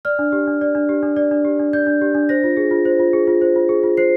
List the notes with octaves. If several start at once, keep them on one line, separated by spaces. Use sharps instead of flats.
D5 F6
D4
G4
D4
D5
D4
G4
D4
D5
D4
G4
D4
D5 G6
D4
G4
D4
C5 A#6
F4
G#4
F4
C5
F4
G#4
F4
C5
F4
G#4
F4
C5 C7